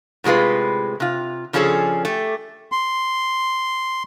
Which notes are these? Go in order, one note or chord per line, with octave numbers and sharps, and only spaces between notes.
A2 C3 G#3 F4 B4
C3 F4
C#3 F3 C#4 D4 G#4 A4
A3 G4
C6